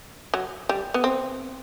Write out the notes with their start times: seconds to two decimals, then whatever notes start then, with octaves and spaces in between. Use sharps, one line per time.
0.34 F#3
0.69 G3
0.94 B3
1.04 C4